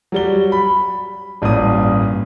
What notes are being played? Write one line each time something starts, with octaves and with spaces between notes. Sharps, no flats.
F#3 G3 G7
B5
A1 G2 A#2 D#6